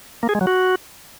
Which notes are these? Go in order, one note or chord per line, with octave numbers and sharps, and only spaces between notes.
A#3
G#4
G#3
F#3
F#4